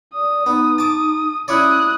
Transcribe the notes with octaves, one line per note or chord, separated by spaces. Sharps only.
D5 D#6
B3 D#4
A5 D6
C#4 E4 C#5 D5 D#6 F#6